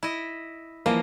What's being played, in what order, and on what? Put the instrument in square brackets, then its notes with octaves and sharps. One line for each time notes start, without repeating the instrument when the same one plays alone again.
[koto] E4 D#5
[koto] E3 F3 D#5 [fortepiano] A#3